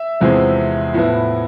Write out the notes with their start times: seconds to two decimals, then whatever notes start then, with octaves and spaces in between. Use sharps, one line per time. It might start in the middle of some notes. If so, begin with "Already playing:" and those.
Already playing: E5
0.20 E2 C3 F3 G#3 C4
0.94 A2 F3 B3 E4